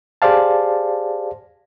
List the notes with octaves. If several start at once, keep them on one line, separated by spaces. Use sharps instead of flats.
G4 G#4 C5 D5 F5 A5